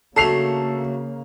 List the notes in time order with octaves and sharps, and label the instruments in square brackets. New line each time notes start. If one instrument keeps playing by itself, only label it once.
[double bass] C#3 A#3 [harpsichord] F#3 A3 D4 [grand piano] A4 C7 F7